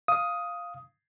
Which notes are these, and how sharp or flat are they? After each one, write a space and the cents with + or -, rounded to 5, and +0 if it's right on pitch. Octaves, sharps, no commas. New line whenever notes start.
F5 +0 D#6 +10